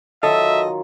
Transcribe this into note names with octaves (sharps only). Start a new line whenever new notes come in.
D#3 F#3 F4 A4 D#5 E5